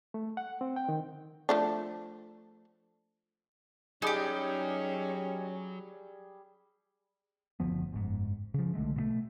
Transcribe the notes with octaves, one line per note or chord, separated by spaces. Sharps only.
A3
F#5
C4
G5
D#3
F3 A3 D4
F#3 G3 C#4 D#4 G4 G#4
F#1 D2 F3 B3
F#1 G#2
C#3 F3
B1 D3 G#3 A3
B2 D3 A3